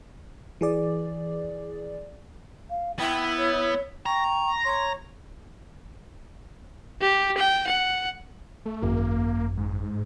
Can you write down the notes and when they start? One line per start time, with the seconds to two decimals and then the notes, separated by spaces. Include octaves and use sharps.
0.61 E3 G#4 D5
2.70 F5
2.99 B3 E4 G5
3.38 C#5
4.06 G5 A#5 C#6
4.64 C#5 C6
7.01 G4
7.38 G5
7.67 F#5
8.66 A3
8.82 G#1 F#2 A#3
9.57 G#2